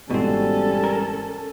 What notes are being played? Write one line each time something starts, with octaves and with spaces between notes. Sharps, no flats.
G#1 G#2 B2 E3 G3 C4 C#4 A4
A#4